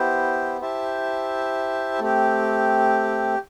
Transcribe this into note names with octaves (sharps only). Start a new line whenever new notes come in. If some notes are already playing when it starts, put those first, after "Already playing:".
Already playing: B3 E4 G4 C5
E4 G4 C5 E5 A5
A3 C4 G4